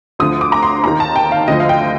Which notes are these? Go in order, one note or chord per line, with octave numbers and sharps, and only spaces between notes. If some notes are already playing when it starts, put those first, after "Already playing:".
D2 D3 F3 D#6
D6
A#5
C6
D#2 D#3 A#5
A5
G5
F5
D2 D3 F3 D#5
F5
G5